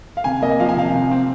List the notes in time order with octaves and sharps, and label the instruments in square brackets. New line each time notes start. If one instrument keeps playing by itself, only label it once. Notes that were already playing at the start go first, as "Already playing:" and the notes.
[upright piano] F5
C3 G#5
A#3 D#5
F3 F5
G#5
C3 F5
C3
C4